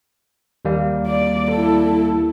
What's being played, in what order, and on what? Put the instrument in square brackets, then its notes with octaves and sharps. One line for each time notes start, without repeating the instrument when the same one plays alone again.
[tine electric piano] D#2 G3 A#3
[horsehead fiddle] D5
E4 A4